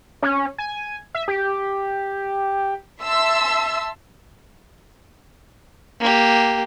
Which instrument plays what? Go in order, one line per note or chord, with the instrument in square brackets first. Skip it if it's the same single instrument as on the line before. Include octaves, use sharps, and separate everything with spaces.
[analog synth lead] C#4
G#5
E5
G4
[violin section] E5 A5 C6 E6
[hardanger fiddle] A#3 G4